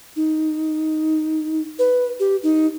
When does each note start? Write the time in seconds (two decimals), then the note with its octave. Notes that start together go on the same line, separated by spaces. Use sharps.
0.16 D#4
1.79 B4
2.20 G4
2.43 D#4